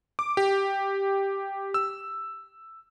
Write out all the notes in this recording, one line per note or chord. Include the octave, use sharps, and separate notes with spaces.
D6
G4
E6